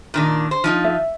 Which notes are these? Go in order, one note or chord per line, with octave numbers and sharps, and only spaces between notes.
A#2 D#3 D4
C5
F3 D#4 F4
E5